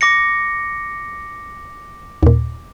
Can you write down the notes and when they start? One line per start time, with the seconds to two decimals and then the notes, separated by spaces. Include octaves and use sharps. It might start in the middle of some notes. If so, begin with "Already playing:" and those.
0.01 D6 A#6 C#7
2.23 D#2 A#2